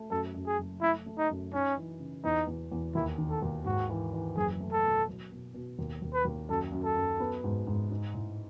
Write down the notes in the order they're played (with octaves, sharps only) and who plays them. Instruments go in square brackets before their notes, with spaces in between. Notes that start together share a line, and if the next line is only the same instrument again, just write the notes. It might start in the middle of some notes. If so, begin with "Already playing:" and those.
Already playing: [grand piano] A3
[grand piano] F#2 [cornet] A4
[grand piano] F#2
[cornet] G#4
[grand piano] F#1
[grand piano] A3 [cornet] E4
[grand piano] A3
[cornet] D#4
[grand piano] F#2
[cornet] C#4 [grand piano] D#4
[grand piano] E3
C#3
[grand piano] E2 [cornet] D#4
[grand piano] E2
E2
[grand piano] D#2 [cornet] E4
[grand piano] D#3
[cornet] A4
[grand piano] D#2
[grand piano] G#2 [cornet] F#4
[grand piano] E3
E3
[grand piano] F#1 [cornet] G#4
[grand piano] A3
[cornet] A4
[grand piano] B2
F#3
B2
B2
D#2
D#2
[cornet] B4
[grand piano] D#2
[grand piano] F#2 [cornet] A4
[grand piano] F#2
[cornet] A4
[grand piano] F#2
B3
G#2
G#2
D#4
A2